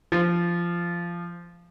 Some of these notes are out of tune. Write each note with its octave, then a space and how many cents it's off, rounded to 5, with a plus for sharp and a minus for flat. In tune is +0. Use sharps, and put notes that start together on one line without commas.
F3 -15